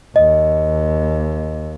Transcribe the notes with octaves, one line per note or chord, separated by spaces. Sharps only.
D#2 D#5